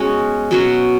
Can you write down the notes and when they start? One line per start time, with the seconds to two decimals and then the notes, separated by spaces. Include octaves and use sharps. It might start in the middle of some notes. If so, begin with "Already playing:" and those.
Already playing: G#3 B3 C#4 F#4
0.51 B2 F#3 C#4 F#4